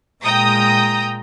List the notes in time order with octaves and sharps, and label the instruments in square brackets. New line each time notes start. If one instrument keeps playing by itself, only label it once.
[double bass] A#2 G#3 [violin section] G5 A#5 D#6